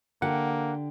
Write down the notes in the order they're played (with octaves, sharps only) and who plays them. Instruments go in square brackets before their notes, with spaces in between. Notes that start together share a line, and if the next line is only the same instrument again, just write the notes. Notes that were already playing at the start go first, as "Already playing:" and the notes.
[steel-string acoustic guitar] D3 G4 [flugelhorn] A#3 [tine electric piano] F#5